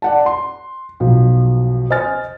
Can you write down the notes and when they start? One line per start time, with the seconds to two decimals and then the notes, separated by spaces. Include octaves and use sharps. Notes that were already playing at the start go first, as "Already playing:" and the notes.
0.02 D5 F#5 A5
0.26 C6
1.00 B1 F3
1.90 C5 D#5 G#5 F6 A6